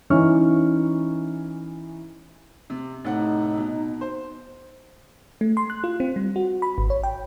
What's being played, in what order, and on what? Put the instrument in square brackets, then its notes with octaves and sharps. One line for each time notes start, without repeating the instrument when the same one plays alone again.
[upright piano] E3 C#4 D#4 C#6 F6
[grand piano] C3
[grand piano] A2 C3 F#5 [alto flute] D#4
[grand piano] B2
C5
[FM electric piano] A3
C6
F#6
F4
C4
G3
F#4
B5
G#1
C#5
G5